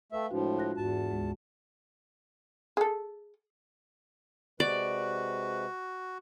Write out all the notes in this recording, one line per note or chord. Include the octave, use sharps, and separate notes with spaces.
A3 B4 E5 F5 G5
A2 F3 G#3 D4 F#4
F4 F#6 A#6
E2 G#2 F#4 A5
D2 G#3
G#4 A4
C3 G#3 F#4 B4 D5